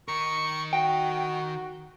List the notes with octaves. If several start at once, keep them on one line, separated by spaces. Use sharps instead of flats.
D#3 A#4 C#6
F#4 G5